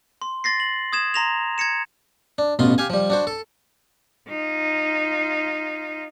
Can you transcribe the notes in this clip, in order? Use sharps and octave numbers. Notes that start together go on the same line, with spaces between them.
C6
C6 A6 A#6 C7
F#7
D#6 G#6 E7
A#5 C6 A#6 E7 F7
G#6 A#6 C#7 E7
D4
A1 B2 B3 F4 C6
G4 F5 G#5
F3 G3
D4 F#4 C5
A4
D#4 F4